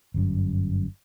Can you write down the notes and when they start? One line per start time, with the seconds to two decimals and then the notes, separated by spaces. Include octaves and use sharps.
0.14 G1 F#2